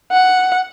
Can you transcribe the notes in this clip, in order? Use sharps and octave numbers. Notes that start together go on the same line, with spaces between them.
F#5